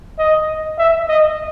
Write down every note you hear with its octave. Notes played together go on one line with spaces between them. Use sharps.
D#5
E5
D#5